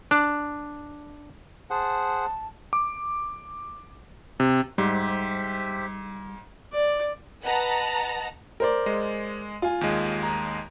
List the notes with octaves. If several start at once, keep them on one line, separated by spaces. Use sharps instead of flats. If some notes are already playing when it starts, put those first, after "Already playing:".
D4
G#4 C5 F#5 A5
D6
C3
G#2 G3 G4 C5 E5
D5
B4 D#5 F#5 A5 A#5
A#4 C5 D5
G#3
F4 G#5
D#2 G#3
A#5